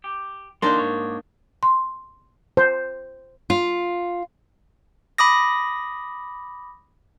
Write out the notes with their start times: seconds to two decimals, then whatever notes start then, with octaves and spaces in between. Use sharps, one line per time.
0.04 G4
0.62 D3 E3 A#3 D4 D#4 C6
0.78 G#2 C#5
1.63 C6
2.57 C5
3.50 F4
5.18 B5 D6 D#6 A#6